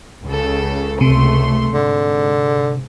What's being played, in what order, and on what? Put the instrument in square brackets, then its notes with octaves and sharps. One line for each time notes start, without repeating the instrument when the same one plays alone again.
[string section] C#2 C#3 A4
[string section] C#2 A3 C6 [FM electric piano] C3
[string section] G#2 [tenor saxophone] D3